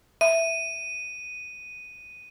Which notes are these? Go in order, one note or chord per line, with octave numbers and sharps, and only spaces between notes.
E5 D#7